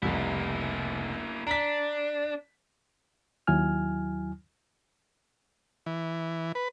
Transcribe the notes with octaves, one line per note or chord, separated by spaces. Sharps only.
F1 C2 A#3 E4
D4 A#5 B6
D#2 F#3 E4 G#5 F6
E3
B4